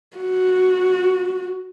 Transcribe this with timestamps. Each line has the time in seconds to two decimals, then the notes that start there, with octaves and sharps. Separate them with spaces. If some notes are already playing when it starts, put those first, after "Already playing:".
0.17 F#4